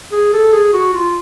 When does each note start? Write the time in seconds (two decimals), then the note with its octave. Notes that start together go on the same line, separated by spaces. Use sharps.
0.12 G#4
0.33 A4
0.52 G#4
0.73 F#4
0.94 F4